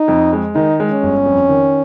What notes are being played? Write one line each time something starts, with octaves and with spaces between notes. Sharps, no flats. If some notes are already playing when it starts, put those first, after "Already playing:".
Already playing: D#4
F2
G#3
D#3 D#4
G#3
C#4
G1
F2
D#3